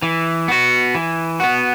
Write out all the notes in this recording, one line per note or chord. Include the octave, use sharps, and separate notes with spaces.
E3
B3 F#4
E3
B3 F#4